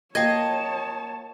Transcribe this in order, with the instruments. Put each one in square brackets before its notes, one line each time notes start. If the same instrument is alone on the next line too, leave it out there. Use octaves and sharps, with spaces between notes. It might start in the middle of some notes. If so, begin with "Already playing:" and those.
[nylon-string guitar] A#3 F4 C5 [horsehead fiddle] C#5 A5 [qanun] D#5 [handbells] G5 G#6